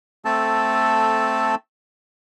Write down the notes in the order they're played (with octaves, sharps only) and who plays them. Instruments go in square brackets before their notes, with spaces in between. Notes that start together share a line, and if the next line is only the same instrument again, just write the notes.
[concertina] A3 C4 A4 A5